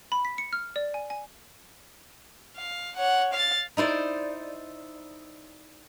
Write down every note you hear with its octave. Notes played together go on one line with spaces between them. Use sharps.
B5
B6
C#7
F6
D5
G#5
G#5
F5
C#5 F#5
F5 A6
D#4 E4 C5 D5